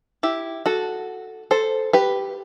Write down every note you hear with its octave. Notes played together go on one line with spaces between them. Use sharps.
E4 G4
F#4 A4
A4 C5
G4 B4